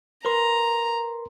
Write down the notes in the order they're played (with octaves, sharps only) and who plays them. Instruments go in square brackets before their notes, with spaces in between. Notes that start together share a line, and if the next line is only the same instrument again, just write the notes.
[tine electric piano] A#4 B4 C6 [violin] A#5